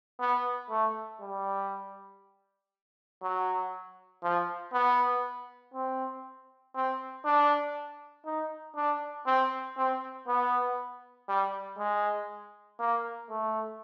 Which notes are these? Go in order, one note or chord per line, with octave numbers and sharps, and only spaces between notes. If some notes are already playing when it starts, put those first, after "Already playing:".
B3
A3
G3
F#3
F3
B3
C4
C4
D4
D#4
D4
C4
C4
B3
G3
G#3
A#3
A3